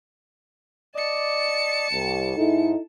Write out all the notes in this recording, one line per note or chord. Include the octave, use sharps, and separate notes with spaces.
D5 D#5 A5 D6 C#7
C2
G#2 G#3 D#4 E4 A4